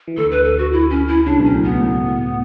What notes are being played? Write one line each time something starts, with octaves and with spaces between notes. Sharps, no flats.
E3
D2 D3 A4
B4
A4
F#4
E4
C#4
E4
C#2 C#3 D4
B1 B2 C#4
A2
B1 B2 B3
A2
A2